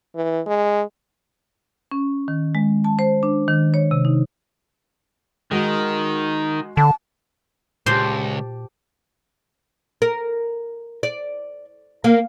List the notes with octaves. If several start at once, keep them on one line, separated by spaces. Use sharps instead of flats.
E3
G#3
C#4
D#3
G#3
A5
C5
D4
D#3
C#5
C3
D#4
D#3 G#3 F#4
D3 A5
C#2 A#2 G4 C5 A5 D6
A#4
D5
A#3